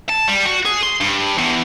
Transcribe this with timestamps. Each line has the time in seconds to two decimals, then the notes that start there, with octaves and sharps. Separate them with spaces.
0.09 A5
0.28 G3
0.45 F#4
0.65 G#4
0.83 C6
1.01 G2
1.38 E2